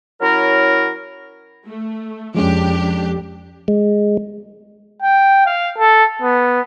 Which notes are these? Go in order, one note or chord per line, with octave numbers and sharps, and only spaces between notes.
F#3 C#4 E4 A#4
A3
F2 F3 G#3 C#4 D4 G4
G#3
G5
F5
A4
B3